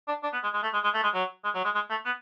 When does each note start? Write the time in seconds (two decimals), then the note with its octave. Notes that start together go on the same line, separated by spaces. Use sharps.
0.08 D4
0.23 D4
0.33 B3
0.43 G#3
0.54 G#3
0.63 A3
0.74 G#3
0.84 G#3
0.94 A3
1.04 G#3
1.14 F#3
1.44 G#3
1.55 F#3
1.64 G#3
1.74 G#3
1.90 A3
2.06 B3